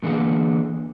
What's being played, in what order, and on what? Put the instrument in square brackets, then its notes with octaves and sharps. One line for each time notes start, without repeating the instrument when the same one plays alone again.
[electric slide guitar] A2 D3 E3 A#3 G#4